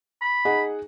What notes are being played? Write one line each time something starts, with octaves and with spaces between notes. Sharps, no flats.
B5
D#4 G#4 F#5